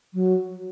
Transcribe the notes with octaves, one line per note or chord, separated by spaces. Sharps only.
F#3